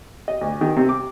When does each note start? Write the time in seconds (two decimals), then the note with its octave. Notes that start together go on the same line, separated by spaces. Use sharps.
0.28 D#5
0.41 D2
0.61 D#3
0.76 C3
0.89 D6